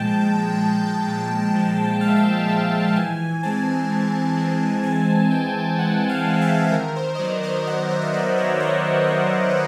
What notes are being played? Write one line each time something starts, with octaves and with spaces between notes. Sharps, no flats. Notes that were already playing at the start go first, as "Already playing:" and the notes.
Already playing: A#2 F3 G#3 G5 A5
A#2
F3 G#3
A#2
F3 G#3
A#2 F5
E5
F5
F3 G#3 E5
E3 G#5
G#3 C4 A5
E3
G#3 C4
E3 G#5
G#3 C4 G5
E3 F#5
F5
G#3 C4
E5
D#3 A#4
C5
D#5
F#3 B3 D5
D#5
D#3 F#5
E5
D#5
F#3 B3 D5
C#5
D#3 C5
F#3 B3 C#5
B4